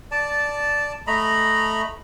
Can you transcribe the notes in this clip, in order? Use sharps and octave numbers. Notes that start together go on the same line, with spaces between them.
D5 A5
A3 D#5 A#5 B5